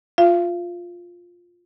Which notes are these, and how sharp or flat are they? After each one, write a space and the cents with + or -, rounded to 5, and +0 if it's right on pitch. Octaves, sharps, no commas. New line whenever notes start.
F4 +10 F5 -35